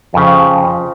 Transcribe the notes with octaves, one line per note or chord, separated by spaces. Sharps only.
F2 C#3 F3